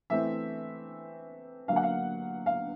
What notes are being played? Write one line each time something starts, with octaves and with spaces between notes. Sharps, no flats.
E3 A3 C4 E5
D3 F#3 A#3 F5
F#5
F5
F5